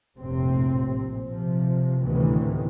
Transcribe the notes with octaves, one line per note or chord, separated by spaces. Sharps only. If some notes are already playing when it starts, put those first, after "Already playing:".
F1 A#1 A2 C3 C4
A#2
C3 F3
D2 A2 C3 D#3 E3 B3